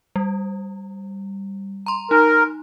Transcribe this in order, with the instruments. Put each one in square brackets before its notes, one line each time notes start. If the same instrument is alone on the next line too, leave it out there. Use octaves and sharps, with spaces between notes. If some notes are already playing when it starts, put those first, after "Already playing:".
[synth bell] G3
A#5 C6
[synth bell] D#4 [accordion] A#4